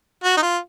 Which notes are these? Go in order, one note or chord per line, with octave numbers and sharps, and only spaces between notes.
F#4
D#4
F4